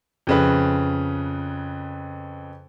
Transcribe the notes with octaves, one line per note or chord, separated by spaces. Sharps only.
F2 C#3 B4